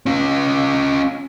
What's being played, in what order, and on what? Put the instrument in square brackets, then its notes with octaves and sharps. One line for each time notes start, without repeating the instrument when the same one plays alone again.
[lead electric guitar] C#4 F4